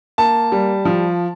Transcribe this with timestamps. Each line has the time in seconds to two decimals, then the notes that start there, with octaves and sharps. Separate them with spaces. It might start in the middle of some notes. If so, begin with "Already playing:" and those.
0.18 A#3 A5
0.52 G3
0.85 F3